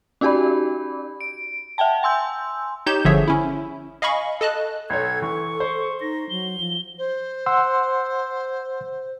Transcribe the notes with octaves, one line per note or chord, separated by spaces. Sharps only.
C#4 D#4 F#4 G4 D5 B5
D7
E5 F#5 G5 A5
G#5 C6 E6 G6
D#4 G4 C#5 G6 E7
G1 D3 F3 G#4 C#5 E5
C#4 E4
D#5 F5 G#5 B5 C#6
A4 D#5 A5 F#6
B1 A4 C#5 G#6
E3 C#6
C5
D#4 A#6
F#3 G7
F3
C5
F#5 C6 E6